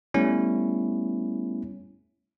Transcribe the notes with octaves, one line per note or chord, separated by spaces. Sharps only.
G3 A3 B3 C#4 E4